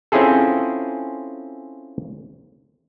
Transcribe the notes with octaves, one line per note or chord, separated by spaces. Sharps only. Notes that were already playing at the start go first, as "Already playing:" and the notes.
C4 C#4 E4 F4 G#4 A4